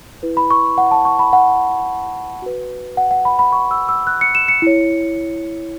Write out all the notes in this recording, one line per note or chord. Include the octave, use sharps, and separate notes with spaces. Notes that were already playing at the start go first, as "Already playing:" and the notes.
E4 B4
B5
C#6
F#5
A5
C#6
B5
F#5
F#4 B4
F#5
F#5
B5
B5
C#6
E6
E6
F#6
C#7
E7
C#7
E4 C#5